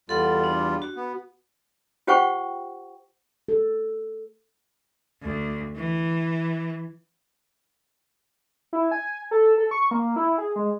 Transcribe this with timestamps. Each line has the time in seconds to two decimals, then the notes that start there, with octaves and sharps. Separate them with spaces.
0.09 E2 G3 F4 A4 F#5
0.44 D4
0.82 F#4
0.96 B3
2.07 F4 G4 C5 F#5 G5 C#6
3.48 A4
5.22 D2
5.76 E3
8.73 E4
8.91 G#5
9.31 A4
9.58 A4
9.71 C#6
9.91 A#3
10.16 E4
10.38 G#4
10.56 G#3